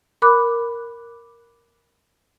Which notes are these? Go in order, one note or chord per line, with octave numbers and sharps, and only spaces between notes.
A#4 B5 D6 F#6